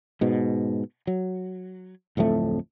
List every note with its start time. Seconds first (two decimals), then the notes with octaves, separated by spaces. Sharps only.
0.21 G#2 B2
1.07 F#3
2.17 D1 F2 A2 A3